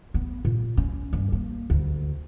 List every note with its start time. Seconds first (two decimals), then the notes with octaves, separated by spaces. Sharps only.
0.14 B3
0.45 A#2
0.77 C#4
1.13 G2
1.32 A#3
1.70 D2